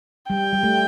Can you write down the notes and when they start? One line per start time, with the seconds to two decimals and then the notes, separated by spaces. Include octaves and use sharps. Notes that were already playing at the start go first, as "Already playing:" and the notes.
0.30 G3 G5
0.53 G3
0.63 A3